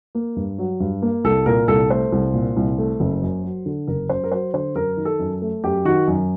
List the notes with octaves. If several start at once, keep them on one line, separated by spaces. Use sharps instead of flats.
A#3
G2
F#3
G2
A#3
C2 A4
A#2 A#4
C2 A4
A3 C5
C2
A#2
C2
A3
F#1
F#2
F#3
D3
F#1 A#4
F#2 C5
A#4
F#3 C5
D3 C5
F#2 A#4
D#3
A4
F#2
A3
F#2 G4
D#3 F#4
F#2